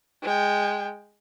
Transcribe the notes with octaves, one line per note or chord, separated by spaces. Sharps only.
G#3 G5